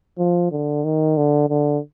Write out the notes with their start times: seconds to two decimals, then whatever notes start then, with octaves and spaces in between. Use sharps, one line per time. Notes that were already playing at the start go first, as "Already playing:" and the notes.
0.18 F3
0.51 D3
0.84 D#3
1.17 D3
1.50 D3